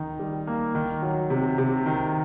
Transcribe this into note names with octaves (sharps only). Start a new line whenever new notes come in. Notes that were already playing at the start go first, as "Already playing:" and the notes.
Already playing: D#3 D#4
G3
A#3
D#3
F#3
C3
C3
D#3